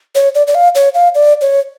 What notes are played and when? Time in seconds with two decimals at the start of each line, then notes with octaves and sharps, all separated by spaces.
0.15 C#5
0.35 D5
0.47 D5
0.55 F5
0.75 C#5
0.95 F5
1.15 D5
1.41 C#5